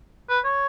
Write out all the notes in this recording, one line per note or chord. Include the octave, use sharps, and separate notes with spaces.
B4
C#5